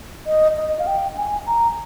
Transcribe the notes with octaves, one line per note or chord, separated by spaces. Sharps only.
D#5
D#5
F5
G5
G#5
A#5